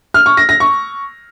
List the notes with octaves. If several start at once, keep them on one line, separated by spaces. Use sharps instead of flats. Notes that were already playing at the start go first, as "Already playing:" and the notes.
F6
C#6
A#6
A#6
C#6